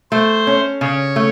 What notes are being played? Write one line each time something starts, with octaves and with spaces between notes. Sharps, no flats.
A3 C5
C#4
C#3 C#5
A3